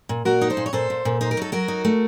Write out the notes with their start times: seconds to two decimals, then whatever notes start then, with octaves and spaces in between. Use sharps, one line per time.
0.09 A#2
0.25 A#2 F#4 A#4
0.41 D#4
0.50 A4 C5
0.57 A#2
0.66 C#5
0.73 A#2 A4 C5
0.90 A#2
1.05 A#2
1.21 D#4 C5
1.31 A#4
1.37 F#3 A4
1.52 F#3 F#4 A#4
1.68 D#4
1.85 A3